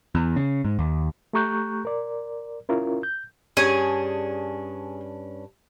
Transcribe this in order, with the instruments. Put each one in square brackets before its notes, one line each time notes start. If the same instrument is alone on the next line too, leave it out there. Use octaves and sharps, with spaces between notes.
[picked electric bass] E2
C#3
G#2
D#2
[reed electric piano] A3 G4 A#5 C#6 F#6 G6
A#4 D5
C#4 E4 F4 A#4
G6
[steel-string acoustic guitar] G2 C#4 D4 [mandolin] G#4